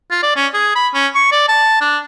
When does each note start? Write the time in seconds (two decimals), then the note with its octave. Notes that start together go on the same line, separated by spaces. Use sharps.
0.11 F4
0.23 D5
0.36 C#4
0.54 G#4
0.75 B5
0.94 C#4
1.15 C#6
1.32 D5
1.48 A5
1.81 D4